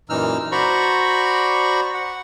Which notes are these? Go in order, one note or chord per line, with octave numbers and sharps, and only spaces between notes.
F#2 A#2 E3 D#4 E6 F6
F#4 C5 D5 A#5 B5 C#6
F#5